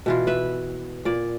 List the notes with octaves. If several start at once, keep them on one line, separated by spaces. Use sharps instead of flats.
B2 E3 F4
B4 E5
A#2 D5